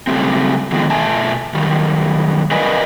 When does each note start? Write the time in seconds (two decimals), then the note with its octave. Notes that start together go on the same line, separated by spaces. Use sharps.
0.07 C#3 E3 F#3 G3 A3 C4
0.72 D3 D#3 F3 G#3 B3
0.90 B2 A3 E5 G#5 A5
1.54 F#2 D#3 G3
2.51 A#4 B4 D5 D#5 F5 G#5